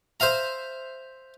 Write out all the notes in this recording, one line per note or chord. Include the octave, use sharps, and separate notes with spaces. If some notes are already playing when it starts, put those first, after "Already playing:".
C5 E5 F5 A#5